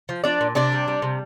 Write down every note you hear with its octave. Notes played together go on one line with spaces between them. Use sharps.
F3
F3 D4 D5
A#2
C3 D4 D5
G3
G3
C3